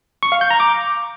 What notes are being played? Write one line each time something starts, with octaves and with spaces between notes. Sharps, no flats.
C#6
F5
G6
A#5
D6